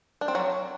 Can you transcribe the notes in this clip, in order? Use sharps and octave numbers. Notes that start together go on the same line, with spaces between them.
D4
C4
F#3